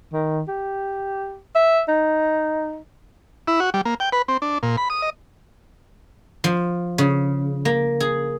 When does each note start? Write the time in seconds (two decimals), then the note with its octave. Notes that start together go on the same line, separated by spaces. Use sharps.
0.13 D#3
0.49 G4
1.55 E5
1.88 D#4
3.48 E4
3.60 F#4
3.74 G3
3.85 A#3
4.00 G5
4.12 B4
4.28 C4
4.42 D4
4.63 A#2
4.77 B5
4.90 D#6
5.02 D#5
6.44 F3
6.98 C#3
7.65 A#3
8.00 G#4